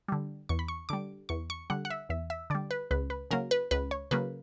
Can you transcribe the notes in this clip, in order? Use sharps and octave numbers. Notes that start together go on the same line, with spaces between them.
D3 G3
E2 C#6
B5
C#6
D3 G3 D6
E2 C#6
C#6
D3 G3 F#5
F#5
E5
E2 E5
E5
D3 G3 D5
B4
C#2 B4
B4
C#3 F#3 A#3 A#4
B4
C#2 B4
C#5
C#3 F#3 A#3 B4